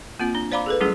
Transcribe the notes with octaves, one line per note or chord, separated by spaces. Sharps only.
A#3 C4 F4
D4
C5 D5 F5 A#5 B5 D6
G#4 A4 B4
F#3 G3 A3 C#4 E4 G#4